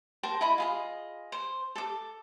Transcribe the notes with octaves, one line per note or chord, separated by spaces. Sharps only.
A#4 C5 G5 A5
E4 D#5 B5
F4 G#4 D#5
C5
A4 D6